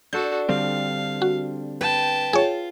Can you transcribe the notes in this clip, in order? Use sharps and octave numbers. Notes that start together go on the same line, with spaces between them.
D4 F#4 A4 G6
D3 G3 C4 F5
F#4
B4 G5 A5
F4 G#4 C#5